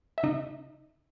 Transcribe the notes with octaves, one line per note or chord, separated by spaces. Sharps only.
E5
C#3 D#4 D#5